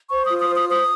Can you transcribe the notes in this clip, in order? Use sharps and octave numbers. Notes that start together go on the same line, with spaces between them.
C5 C#6
F4 D#6
D#6
C5
D#6
C5 D#6